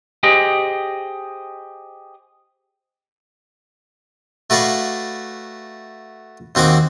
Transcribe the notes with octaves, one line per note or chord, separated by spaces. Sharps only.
G4 G#4 C5 D#5
A3 F#4 B4 D5 F5 G#5
D#2 C4 F#4 G#5 D6